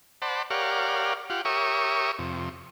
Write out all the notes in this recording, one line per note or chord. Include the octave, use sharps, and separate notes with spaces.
C5 D5 F#5 A5 B5
G4 A#4 C#5 D5 F5 F#5
F4 G4 F#5
G4 A#4 C#5 E5 C#6 D#6
F2 C3